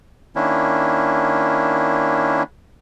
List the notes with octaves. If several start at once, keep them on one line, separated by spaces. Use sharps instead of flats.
D#3 A#3 C#4 D4 E4